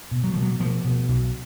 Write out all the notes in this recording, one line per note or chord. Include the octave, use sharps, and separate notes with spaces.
B2
F#3
B2 F3
F#3
B2 F3
B2
B1